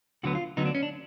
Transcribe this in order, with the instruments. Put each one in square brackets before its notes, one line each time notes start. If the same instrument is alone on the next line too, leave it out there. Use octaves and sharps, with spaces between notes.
[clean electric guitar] D2 D3 F#3 B3 F#4
F4
D2 D3 F#3 B3 D#4
D4
C#4
D4